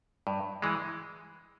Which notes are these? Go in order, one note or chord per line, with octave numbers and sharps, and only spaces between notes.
G2
E3 G#3